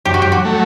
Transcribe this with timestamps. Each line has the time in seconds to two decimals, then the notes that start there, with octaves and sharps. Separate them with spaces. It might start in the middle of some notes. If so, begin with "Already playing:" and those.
0.05 F#2 G4
0.14 F#4
0.22 G4
0.32 F#4
0.45 F#3 A3